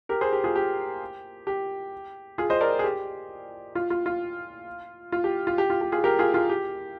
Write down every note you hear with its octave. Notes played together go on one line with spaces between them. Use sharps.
G4 A#4
G#4 C5
G4
F4 G#4
G4
G4
F4 G#4
C5 D#5
A#4 D5
G#4
G4
F4
F4
F4
F4
G4
F4
G4
F4
G4
F4 G#4
G4 A#4
F4 G#4
F4 G#4
G4